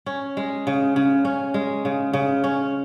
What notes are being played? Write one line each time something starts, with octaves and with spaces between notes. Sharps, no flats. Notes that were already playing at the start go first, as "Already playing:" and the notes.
C#4
G#3
C#3
C#3
C#4
G#3
C#3
C#3
C#4